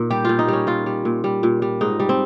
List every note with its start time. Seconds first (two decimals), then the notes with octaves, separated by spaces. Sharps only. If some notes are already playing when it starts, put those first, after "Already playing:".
Already playing: A#2 D#4
0.11 G3 G4
0.25 A#2 F4
0.39 D#4
0.48 G3 C#4
0.67 A#2 F4
0.86 G3
1.05 A#2
1.24 G3
1.43 A#2
1.62 G3
1.81 G#2 D#4
2.00 G3
2.09 C4